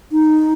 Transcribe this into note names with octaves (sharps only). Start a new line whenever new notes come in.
D#4